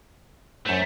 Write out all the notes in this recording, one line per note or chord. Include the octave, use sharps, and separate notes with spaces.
F#2 A3 C5